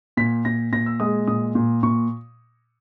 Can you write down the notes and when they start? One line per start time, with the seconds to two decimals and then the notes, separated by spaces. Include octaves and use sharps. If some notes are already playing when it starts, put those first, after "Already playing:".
0.17 A#2 B6
0.45 A#2 A#6
0.73 A#2 A#6
0.86 E6
1.00 G#3 D#6
1.27 A#2 D#6
1.55 A#2
1.83 A#2 C#6